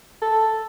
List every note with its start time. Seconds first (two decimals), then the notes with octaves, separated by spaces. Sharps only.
0.22 A4